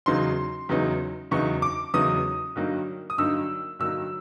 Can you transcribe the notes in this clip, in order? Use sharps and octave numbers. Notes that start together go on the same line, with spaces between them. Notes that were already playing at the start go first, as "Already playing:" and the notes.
E2 C#3 F#3 B3 D#4 C6
E2 C#3 F#3 B3 D#4
E2 C#3 F#3 B3 D#4 C#6
D6
E2 C#3 F#3 B3 D#4 D#6
G2 D3 F#3 A#3 D#4
D#6
G2 D3 F#3 A#3 D#4 E6
G2 D3 F#3 A#3 D#4 E6